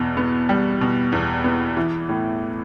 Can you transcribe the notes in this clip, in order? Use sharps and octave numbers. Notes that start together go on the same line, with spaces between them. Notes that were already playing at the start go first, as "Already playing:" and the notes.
Already playing: E2 B2
B3
G3
B2
E2
B3
E3
A2